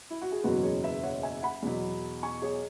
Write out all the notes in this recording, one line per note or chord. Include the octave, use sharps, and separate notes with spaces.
E4
F#4
G#4
F#1 E2 B2 F#3 F#4 B4
G#4 C#5
B4 E5
C#5 F#5
E5 G#5
F#5 B5
E2 B2 F#3
G#5 C#6
G#4 C#5